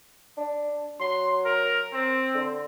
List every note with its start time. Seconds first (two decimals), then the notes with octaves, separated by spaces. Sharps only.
0.37 D4
1.00 F#3 C6
1.45 A#4
1.93 C4
2.34 D3